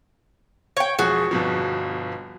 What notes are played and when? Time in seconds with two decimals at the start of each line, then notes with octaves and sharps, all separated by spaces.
0.77 C#5 G5
0.99 E1 F3 F#4 G#4
1.31 G1 B2 F3